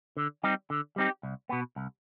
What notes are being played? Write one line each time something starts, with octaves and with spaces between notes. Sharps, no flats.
D3
G3 C4 D#4 G4
D3
G3 C4 D#4 G4
C2
B2 B3
C2